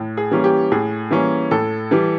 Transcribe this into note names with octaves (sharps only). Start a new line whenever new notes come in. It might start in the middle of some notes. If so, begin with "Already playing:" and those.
Already playing: A2
G#4
E3 G3 A#3 C#4
G4
A2 G#4
E3 G3 A#3 C#4
A2 A4
E3 G3